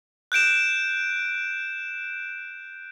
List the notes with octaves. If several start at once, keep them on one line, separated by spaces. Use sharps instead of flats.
F#6 G6 D7 E7